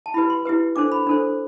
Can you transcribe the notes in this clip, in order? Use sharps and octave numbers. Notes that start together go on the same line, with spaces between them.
A5
E4 G4 B4 B5
C6
E4 G4 B4
D4 A4 C5 D6
B5
D4 A4 C5